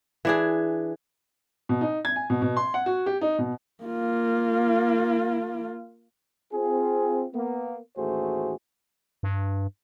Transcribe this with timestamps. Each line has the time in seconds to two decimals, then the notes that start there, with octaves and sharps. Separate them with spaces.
0.25 E3 D4 G#4
1.69 B2
1.81 D#4
2.05 G#6
2.16 G#5
2.30 B2
2.42 B2
2.57 C6
2.74 F#5
2.86 F#4
3.06 G4
3.21 D#4
3.39 B2
3.84 A#3 F4
6.53 C4 F4 G#4
7.33 A#3 B3
7.97 A1 D#2 A3 F#4 G#4 C5
9.23 G2